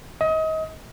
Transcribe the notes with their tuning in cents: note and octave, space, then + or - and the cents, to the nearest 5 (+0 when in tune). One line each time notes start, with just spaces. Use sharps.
D#5 +30